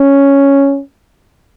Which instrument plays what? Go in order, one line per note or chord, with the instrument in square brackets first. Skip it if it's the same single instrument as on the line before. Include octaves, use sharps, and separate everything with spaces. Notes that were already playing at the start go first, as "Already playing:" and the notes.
Already playing: [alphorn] C#4